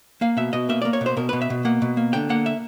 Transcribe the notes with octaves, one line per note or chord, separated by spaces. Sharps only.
A#3 F5
B2 E5
B2 D#5
A#3 E5
A#3 D5
C#5
B2
C5
B2 A#4
B2 B4
E5
B2
A#3 F#5
B2
A#3
D3 G5
A#3 F#5
E5